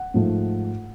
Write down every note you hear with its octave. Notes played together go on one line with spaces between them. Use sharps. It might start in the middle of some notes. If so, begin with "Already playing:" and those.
Already playing: F#5
G#2 F3 A3